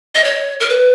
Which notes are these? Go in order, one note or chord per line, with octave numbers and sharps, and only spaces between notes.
D#5
C#5
A#4
B4